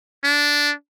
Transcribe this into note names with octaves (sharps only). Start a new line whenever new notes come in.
D4